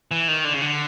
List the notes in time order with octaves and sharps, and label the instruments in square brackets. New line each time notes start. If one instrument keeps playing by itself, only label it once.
[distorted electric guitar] E3
D#3
D3
C#3
D3